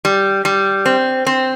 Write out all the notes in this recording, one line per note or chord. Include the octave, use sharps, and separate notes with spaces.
G3
G3
C4
C4